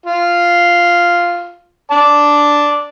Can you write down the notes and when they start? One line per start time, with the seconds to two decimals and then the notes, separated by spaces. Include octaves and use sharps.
0.06 F4
1.91 D5 A5